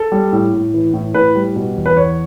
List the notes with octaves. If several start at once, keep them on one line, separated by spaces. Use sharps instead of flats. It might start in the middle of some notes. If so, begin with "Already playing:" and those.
Already playing: A4
G3
A2
A2
E3
A2
A2 B4
G3
B2
E2
B4
E2 C#5